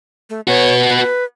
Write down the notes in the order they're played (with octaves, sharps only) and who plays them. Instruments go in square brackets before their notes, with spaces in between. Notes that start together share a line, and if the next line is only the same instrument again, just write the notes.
[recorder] A3
[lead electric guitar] B3 F#4 [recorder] C#5
[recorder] B4